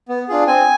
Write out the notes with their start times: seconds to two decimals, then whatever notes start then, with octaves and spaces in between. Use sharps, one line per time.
0.09 B3
0.28 D4 F4 G#4
0.47 C4 G#5